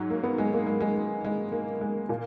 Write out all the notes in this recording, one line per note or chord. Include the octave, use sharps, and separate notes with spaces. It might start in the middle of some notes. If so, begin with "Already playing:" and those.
Already playing: G#2 F#3
A#3
B3
G#3
A#3
G#3
G#3
A#3
G#3
A#3
G#3
A#2 A#3